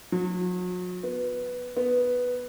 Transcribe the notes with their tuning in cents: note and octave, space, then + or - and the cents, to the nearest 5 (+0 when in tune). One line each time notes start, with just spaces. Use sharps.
F#3 -40
B3 +0
B3 +0